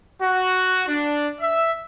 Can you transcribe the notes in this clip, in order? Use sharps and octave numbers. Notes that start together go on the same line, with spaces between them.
F#4
D4
E5